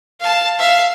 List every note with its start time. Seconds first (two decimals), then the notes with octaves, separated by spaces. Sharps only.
0.20 F5 A5
0.59 E5 F5